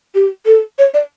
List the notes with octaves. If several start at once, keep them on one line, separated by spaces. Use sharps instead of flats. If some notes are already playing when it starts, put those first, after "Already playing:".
G4
A4
C#5
D5